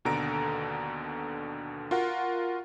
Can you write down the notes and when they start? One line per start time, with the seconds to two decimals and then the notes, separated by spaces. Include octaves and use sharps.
0.05 D#2 B2 D3 A4 A#5 D7
1.91 F4 F#4 A#4 F#5